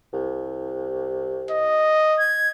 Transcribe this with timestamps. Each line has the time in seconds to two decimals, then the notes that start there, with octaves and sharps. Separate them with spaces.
0.14 C2
1.51 D#5
2.18 G#6